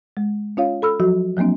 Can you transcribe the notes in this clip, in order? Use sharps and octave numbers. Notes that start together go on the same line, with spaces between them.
G#3
C#4 F4 C#5 F5
A4 B5 E6 F6
F3 F#3 F#4
F3 F#3 A#3 C4 D4